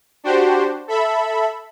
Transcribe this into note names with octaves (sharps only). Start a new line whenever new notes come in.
D4 F#4 G4 C5
A4 E5 B5